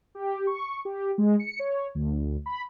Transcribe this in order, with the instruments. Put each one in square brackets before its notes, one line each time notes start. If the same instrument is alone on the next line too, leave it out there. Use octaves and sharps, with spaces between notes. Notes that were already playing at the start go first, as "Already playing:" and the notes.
[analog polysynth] G4
C#6
G4
G#3
C#7
C#5
D2
B5